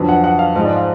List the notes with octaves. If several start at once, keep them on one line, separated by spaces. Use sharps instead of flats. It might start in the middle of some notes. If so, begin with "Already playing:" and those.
Already playing: F2 D3 F#3 B4
F#5
F#5
F5
G#2 F3 G#3 D#5
D5
F5